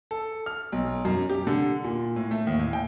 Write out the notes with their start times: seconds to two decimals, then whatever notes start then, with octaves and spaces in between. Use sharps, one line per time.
0.11 A4
0.46 F6
0.72 B1
1.05 F#2
1.29 G4
1.47 D3
1.84 A#2
2.16 A2
2.31 A3
2.47 D#2
2.59 A2
2.73 G5